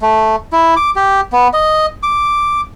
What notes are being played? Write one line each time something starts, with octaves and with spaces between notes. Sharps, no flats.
A3
E4
D6
G4
B3
D#5
D6